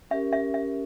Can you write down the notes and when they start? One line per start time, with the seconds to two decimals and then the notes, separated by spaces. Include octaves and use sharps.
0.11 C#4 G4 A#4 E5
0.33 E5
0.54 E5